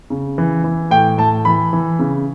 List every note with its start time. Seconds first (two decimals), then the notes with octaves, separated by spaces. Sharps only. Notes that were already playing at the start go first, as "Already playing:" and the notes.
0.10 C#3
0.38 E3
0.64 E3
0.91 A2 G5
1.18 A2 A5
1.45 E3 B5
1.73 E3
1.99 C#3